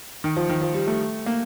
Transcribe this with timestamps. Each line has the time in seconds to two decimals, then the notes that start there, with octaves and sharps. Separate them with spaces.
0.24 D#3
0.36 F3
0.49 D#3
0.61 F3
0.74 G3
0.87 A3
1.26 A#3